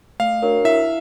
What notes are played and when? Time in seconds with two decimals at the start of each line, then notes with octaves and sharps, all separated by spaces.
0.20 A3 F5
0.42 D4 F#4 A#4 C#5
0.64 E4 E5